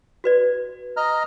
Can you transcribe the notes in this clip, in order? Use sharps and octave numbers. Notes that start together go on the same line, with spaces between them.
F#4 B4 D5
D#5 A#5 F6